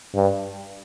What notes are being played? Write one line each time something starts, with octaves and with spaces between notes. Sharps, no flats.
G2